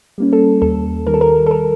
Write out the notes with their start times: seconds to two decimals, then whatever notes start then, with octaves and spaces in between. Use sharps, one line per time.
0.18 G3 A#3 C#4
0.33 A4
0.62 D#2 A4
1.07 D#3 G3 A#4
1.14 A4
1.21 A#4
1.46 A4
1.51 A#4